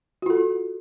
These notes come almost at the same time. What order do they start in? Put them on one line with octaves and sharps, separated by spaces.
F#4 F4 A4